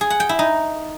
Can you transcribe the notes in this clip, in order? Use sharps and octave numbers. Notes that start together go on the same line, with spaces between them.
G#4
F#5
G5
E4
D#4